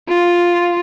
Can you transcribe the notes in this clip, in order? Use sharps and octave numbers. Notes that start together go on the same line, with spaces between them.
F4